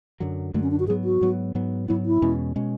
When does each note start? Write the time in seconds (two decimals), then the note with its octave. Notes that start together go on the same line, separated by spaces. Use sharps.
0.20 F#2 D3 F#3
0.54 F#2 D3 F#3 A3
0.63 C#4
0.71 D4
0.79 F#4
0.88 G#2 F#3 B3 G#4
1.04 F#4
1.21 G#2 F#3 B3
1.55 G#2 F#3 B3
1.88 G#2 F#3 B3 E4
2.06 E4
2.22 E2 B2 G#3 C#4
2.56 B2 G#3 C#4